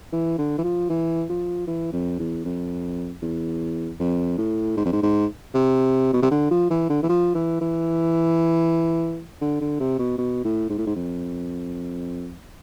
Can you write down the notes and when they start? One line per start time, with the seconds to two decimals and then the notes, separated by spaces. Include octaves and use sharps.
0.13 E3
0.38 D3
0.58 E3
0.64 F3
0.90 E3
1.29 F3
1.67 E3
1.93 F2
2.19 E2
2.45 F2
3.22 E2
4.00 F2
4.38 A2
4.77 G#2
4.85 F2
4.93 G#2
5.03 G#2
5.54 C3
6.13 B2
6.22 C3
6.31 D3
6.51 F3
6.70 E3
6.90 D3
7.03 E3
7.09 F3
7.35 E3
7.61 E3
9.41 D3
9.61 D3
9.80 C3
9.99 B2
10.18 B2
10.45 A2
10.70 G#2
10.78 A2
10.87 G#2
10.96 F2